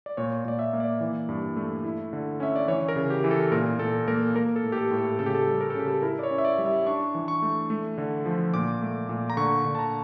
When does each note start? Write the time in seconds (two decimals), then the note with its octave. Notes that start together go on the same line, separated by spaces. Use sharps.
0.06 D5
0.17 A#2 C#5
0.45 A#2 D5
0.59 E5
0.73 A#3
0.80 D5
1.01 E3
1.29 G2
1.56 A3
1.84 E4
2.13 D3
2.40 C#4 E5
2.56 D5
2.68 E3 C#5
2.89 A#4
2.96 C#3
3.10 G4
3.24 E3
3.31 A4
3.52 A#2 A#4
3.79 A#2 A4
4.08 A#3 A#4
4.35 A#3 A#4
4.56 A4
4.64 A2
4.72 G4
4.78 A4
4.91 A2
4.98 A4
5.19 C#3 A4
5.26 G4
5.35 A4
5.47 G3
5.61 A#4
5.70 A4
5.75 C#3 G4
5.88 A4
6.02 E4 A#4
6.19 D5
6.23 C#5
6.31 C#4
6.38 E5
6.45 D5
6.58 G3
6.66 E5
6.86 D4 C#6
7.14 E3
7.28 C#6
7.42 A3
7.70 A3
7.98 D3
8.25 F3
8.54 A#2 D6
8.82 A3
9.09 A#2
9.30 A#5
9.37 D3 C#6
9.65 D3
9.75 A5
9.79 A#5